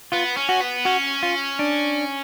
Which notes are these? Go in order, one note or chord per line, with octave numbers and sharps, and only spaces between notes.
B3 F4
C#4
F#4
B3
C#4 F#4
F4
D4